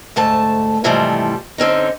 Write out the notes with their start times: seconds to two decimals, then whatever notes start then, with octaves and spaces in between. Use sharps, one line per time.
0.16 D2 G#2 A3 A5
0.84 G#2 C3 E3 F3 G3 A3
1.58 D3 C4 C#4 D#4